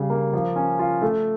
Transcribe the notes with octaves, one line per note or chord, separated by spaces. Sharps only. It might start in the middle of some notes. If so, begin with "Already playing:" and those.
Already playing: C#3 G3
A#3
F3
C#4
F4
A3